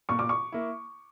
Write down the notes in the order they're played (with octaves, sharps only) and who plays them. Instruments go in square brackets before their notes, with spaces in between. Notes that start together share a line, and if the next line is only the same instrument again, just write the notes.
[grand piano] A#2 [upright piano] C#6
[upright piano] D6
C#6
[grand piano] A#3 E4